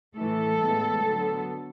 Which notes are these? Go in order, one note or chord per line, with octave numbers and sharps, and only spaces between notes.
A2 E3 A3 A4
A2 E3 G#3 B3
D3 F#3 B3